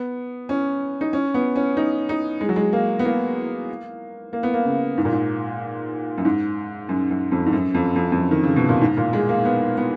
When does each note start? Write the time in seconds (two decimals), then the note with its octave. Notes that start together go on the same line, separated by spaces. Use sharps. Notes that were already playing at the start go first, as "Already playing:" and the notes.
Already playing: B3
0.49 C#4
1.01 D#4
1.13 C#4
1.34 B3
1.56 C#4
1.77 D#4
2.09 D#4
2.41 G#3
2.49 F#3
2.56 G#3
2.73 A#3
2.99 B3
3.05 A#3
4.33 A#3
4.43 B3
4.54 A#3
4.65 C#3
4.97 G#2
5.05 A#2
5.12 G#2
6.18 F#2
6.25 G#2
6.89 F#2
7.11 F#2
7.32 F2
7.46 G#2
7.53 F#2
7.74 F2
7.96 F2
8.12 F2
8.17 F#2
8.31 D#3
8.44 C#3
8.56 B2
8.69 A#2
8.81 G#2
8.97 A#2
9.13 G#3
9.29 A#3
9.45 B3
9.77 B3